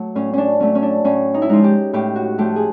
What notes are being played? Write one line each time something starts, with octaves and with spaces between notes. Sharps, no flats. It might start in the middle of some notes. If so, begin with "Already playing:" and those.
Already playing: F#3 A3
A2 C#4
C#4 D4
F#3 A3 C#4
C#4
D4
A2 C#4
D#4
E4
F3 G#3 D#4
G4
A2 G4
F#4
F3 A3 G4
G#4